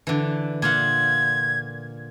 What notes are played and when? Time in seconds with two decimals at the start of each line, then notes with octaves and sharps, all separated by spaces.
0.07 D3 E3
0.62 A#2 F4 F#5 G#6